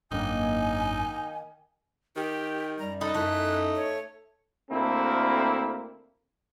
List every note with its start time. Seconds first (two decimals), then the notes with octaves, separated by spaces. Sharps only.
0.11 G#1 F#2 D#3 A#3 D4 D#4 G#5
2.16 D#3 G4
2.79 F#2 G3 A#5
3.01 D#4 A4 B4
3.15 F#2 A3 E4 F#6
3.76 C#5
4.71 D2 A#3 C4 E4 A4